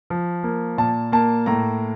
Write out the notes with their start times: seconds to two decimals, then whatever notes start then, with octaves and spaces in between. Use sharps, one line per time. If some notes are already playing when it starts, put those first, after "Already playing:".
0.10 F3
0.43 A#3
0.78 A#2 A5
1.12 A#3 A5
1.46 A2 A#5